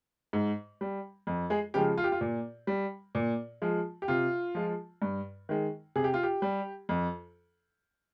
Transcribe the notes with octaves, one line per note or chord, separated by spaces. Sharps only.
G#2
G3
F2
G#3 G#4
C#3 F3 G#3 G4
F4
G4
F4
A#2
G3
A#2
F3 G#3
G4
C3 F4
F3 G#3
G2
D#3 G#3
C3 G#4
G4
F4
G4
G3
F2